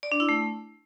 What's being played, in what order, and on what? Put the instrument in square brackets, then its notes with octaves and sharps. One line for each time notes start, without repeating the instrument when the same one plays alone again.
[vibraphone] D5
D4
E4
A3